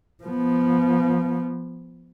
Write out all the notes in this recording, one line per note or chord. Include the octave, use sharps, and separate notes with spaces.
F3 B3